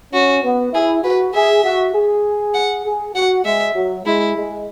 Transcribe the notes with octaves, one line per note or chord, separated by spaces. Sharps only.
C#4 F#4
B3
E4 G#4
F#4 B4
G#4 E5
F#4
G#4
F#5
G#4
F#4 F#5
G#3 E5
F#3
G#3 E4
G#3